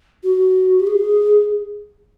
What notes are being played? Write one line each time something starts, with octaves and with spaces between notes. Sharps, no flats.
F#4
G4
G#4